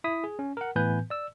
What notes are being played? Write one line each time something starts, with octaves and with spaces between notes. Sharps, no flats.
E4 D#6 B6
G#4
C#4
A#4 F#5
A2 E3 B3 B4 G#5 G6
D5 E6